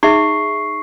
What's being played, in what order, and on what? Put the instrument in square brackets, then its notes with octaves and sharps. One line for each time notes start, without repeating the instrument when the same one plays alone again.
[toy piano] D#4 G#4 E5 [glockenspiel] C#6 C7